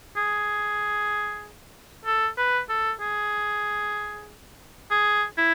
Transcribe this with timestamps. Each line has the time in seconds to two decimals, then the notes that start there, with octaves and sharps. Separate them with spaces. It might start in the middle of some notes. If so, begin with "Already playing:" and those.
0.16 G#4
2.05 A4
2.38 B4
2.69 A4
3.00 G#4
4.91 G#4
5.38 E4